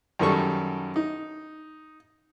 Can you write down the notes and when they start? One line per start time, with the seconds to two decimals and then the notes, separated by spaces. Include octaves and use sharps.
0.19 F#2 D#3 G3 A4 C#6
0.96 D#4